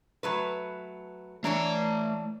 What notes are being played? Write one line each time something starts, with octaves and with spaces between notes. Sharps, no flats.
F#3 A3 B4
E3 A3 D4 C#5 A#5